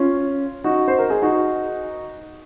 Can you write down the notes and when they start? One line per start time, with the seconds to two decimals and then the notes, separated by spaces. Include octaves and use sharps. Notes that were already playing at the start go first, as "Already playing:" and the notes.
Already playing: C#4 F4
0.64 D#4 F#4
0.88 C5
0.99 A#4
1.10 G#4
1.22 D#4 F#4